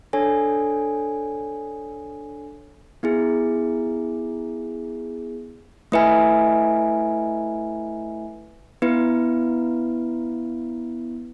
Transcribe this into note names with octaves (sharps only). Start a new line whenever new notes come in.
D4 A4 C#5 G#5
B3 E4 G#4
A3 E4 B4 E5 G#5
B3 E4 B4